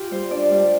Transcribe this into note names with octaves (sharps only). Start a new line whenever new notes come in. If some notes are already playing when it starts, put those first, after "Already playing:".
Already playing: F4 G4
G3 C5
D4 D5
G3